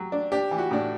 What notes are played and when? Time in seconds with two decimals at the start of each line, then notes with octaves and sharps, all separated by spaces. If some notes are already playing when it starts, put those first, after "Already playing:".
Already playing: F#3 G4
0.12 D4
0.32 D4 G4
0.51 E3
0.58 F#4
0.71 A2 D4